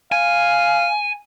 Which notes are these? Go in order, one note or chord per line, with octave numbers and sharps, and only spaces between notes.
F5 G#5